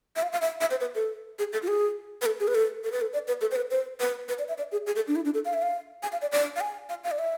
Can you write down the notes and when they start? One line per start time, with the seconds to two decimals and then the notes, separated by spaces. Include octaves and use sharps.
0.16 E5
0.23 F5
0.33 F5
0.42 E5
0.61 E5
0.71 C5
0.81 B4
0.95 A4
1.39 G#4
1.53 A4
1.63 F4
1.68 G#4
2.22 B4
2.26 A4
2.40 G#4
2.48 B4
2.55 A4
2.84 A4
2.92 B4
3.01 A4
3.13 D5
3.28 B4
3.41 A4
3.51 C5
3.56 B4
3.71 C5
4.00 B4
4.28 B4
4.39 D5
4.48 E5
4.58 D5
4.72 G#4
4.87 G#4
4.96 A4
5.08 D4
5.16 E4
5.25 D4
5.34 A4
5.45 F5
5.54 E5
5.62 F5
6.03 G#5
6.12 F5
6.22 D5
6.32 D5
6.56 F5
6.61 G#5
6.89 F5
7.04 F5
7.11 D5
7.19 E5